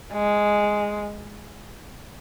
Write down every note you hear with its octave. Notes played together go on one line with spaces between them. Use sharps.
G#3